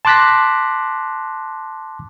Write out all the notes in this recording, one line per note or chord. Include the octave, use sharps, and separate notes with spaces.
A5 C6 D6 F#6 A#6 B6